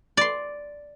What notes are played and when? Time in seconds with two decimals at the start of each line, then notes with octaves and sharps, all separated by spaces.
0.17 D5 C6